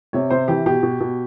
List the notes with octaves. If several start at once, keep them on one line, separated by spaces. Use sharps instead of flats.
C3 C#5
C3 C5
E3 G4
B2 G4
B2
B2